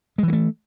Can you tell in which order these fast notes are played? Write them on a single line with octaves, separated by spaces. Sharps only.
G#3 E3 F#3 A3